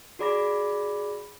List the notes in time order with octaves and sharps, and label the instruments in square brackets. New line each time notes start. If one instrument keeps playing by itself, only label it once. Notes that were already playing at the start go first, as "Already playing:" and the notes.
[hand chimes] F#4 G#4 D5 B5 D6 A#6